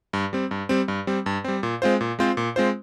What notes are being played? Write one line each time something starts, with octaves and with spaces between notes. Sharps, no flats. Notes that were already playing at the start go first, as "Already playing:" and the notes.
G2
G3 C4
G2
G3 C4
G2
G3 C4
G2
G3 C4
A#2
G#3 C4 F4 C5
A#2
G#3 C4 F4 C5
A#2
G#3 C4 F4 C5